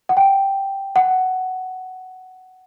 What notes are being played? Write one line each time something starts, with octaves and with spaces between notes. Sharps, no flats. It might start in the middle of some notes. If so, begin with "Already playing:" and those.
F#5
G5
F#5